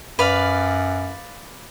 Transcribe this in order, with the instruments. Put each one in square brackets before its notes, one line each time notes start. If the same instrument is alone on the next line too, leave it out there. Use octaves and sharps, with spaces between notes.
[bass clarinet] F#2 [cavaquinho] B4 D5 F5